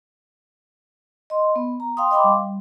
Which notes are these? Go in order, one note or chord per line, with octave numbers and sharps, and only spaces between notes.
D#5 C6
B3
A#5
F5 G5 C6 D#6
D#5 F5 G5 B5 C6 D6
G3